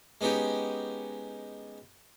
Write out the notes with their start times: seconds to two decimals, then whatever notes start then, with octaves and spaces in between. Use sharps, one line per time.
0.21 G#3 B3 C#4 D#4 G4